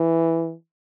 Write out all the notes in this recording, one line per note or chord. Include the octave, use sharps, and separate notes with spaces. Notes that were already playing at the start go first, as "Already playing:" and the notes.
Already playing: E3